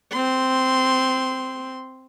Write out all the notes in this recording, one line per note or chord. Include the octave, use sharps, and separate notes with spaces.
C4 C6